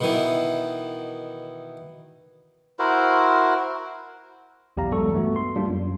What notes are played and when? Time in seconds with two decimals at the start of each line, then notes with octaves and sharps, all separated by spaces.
0.01 B2 D#3 E3
2.79 E4 F#4 A#4 C5
4.77 B1 E2 G4 D5 F5 A#5
4.91 E2 G2 F#3 G#3 A4 C#6
5.13 G2 A3 B3 F#4
5.36 C6
5.56 G3 A#3 D4 F4
5.69 F#2